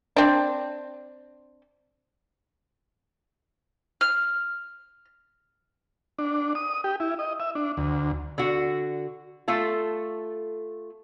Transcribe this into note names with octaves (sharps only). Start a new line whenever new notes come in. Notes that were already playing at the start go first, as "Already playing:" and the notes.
C4 D4
F6
D4
D#6
G4
E4
D#5
E5
D4
D2
D3 F#4
A3 F4 A4